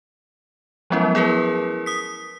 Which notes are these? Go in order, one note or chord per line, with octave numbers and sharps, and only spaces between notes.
F3 F#3 G#3 B3 C#4 E4
E4 G#4 A#4 B4
D#6 B6